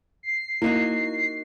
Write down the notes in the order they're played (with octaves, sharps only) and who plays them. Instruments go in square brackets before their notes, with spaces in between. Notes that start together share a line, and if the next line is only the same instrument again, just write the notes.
[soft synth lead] C7
[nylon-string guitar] A#3 D#4 F#4 [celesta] E4